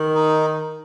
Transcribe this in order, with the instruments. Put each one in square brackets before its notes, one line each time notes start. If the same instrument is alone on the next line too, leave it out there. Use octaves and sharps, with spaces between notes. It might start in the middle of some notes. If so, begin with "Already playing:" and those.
Already playing: [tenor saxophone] D#3
[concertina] D#4